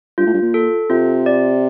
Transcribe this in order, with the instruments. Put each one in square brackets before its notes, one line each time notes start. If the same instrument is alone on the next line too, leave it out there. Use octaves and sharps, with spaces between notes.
[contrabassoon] G2 [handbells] F4
[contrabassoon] A2
G2
A#2
[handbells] A4
[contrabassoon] C3 [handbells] F4
[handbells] D5